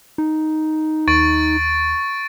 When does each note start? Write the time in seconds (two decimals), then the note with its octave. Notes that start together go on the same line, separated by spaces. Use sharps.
0.18 D#4
1.08 D#2 C#6 A6 D7